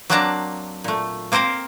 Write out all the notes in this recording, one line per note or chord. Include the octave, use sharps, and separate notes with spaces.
F#3 A#3 C4 D4 A5 A#5
A#2 A3
A#3 C4 A#4 C5 F5